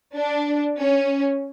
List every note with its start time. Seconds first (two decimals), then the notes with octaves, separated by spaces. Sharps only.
0.15 D4
0.78 C#4